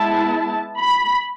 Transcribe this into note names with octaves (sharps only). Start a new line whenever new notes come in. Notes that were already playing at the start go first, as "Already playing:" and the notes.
Already playing: G#3 B3 E4 A5
B5